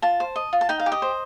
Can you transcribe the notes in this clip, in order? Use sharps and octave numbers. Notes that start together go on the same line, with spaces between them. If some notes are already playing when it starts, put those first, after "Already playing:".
F4 A5
C5
D#5
F4
A5
D#4 G5
F5
G4
D#5
C5